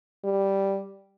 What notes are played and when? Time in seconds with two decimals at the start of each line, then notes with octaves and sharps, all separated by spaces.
0.24 G3